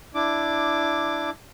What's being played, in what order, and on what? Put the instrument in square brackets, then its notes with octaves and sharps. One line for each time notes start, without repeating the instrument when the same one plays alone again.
[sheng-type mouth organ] D4 E4 D6